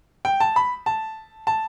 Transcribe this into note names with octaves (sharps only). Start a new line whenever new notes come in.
G5
A5
B5
A5
A5